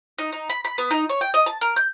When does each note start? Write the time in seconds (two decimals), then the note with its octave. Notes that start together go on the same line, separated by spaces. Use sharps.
0.18 D#4
0.33 D#4
0.50 B5
0.65 B5
0.78 B3
0.91 D#4
1.09 C#5
1.21 G5
1.34 D#5
1.46 A5
1.61 A#4
1.76 G6